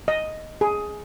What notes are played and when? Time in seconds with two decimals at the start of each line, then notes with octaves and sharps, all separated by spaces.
0.08 D#5
0.61 G#4